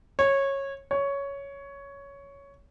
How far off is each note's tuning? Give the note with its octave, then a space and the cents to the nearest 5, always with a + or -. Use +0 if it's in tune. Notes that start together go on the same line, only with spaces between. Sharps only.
C#5 -15
C#5 +10